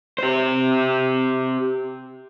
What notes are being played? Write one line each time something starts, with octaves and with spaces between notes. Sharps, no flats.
G4 C5